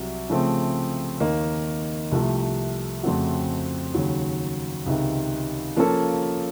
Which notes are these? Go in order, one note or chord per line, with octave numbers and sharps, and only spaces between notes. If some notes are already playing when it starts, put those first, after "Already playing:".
Already playing: C2 C3 F#3
C#3 F3 A3 C4
D#2 D#3 A#3 D#4
C2 C3 F3 A3
F2 C#3 A3 C4 F#4
D#2 C#3 F#3
C#2 C3 D#3
F3 A#3 C#4 F4 A4